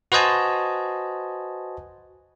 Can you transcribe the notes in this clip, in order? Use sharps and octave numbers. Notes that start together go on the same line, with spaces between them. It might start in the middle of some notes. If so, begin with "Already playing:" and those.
F#4 B4 C5 D#5 G#5 A5